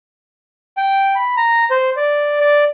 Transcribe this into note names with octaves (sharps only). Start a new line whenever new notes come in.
G5
B5
A#5
C5
D5
D5